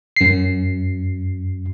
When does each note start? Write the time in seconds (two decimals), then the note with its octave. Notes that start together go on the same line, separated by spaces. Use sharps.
0.17 F#2 C7